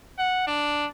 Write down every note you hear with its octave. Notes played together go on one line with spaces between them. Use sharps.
F#5
D4